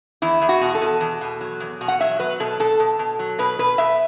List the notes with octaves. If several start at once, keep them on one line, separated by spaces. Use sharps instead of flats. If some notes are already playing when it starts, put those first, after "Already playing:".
E2 E4
E2
F#4
B2
A4
B2
E2
B2
F#3
E2
B2
F#5
F#3 E5
F#3 B4
B2 A4
B2 A4
B2
B2
F#3
B2 B4
B2 B4
B2 E5